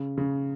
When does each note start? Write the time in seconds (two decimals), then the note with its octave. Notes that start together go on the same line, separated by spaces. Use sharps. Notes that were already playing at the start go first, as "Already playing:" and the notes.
Already playing: C#3
0.18 C#3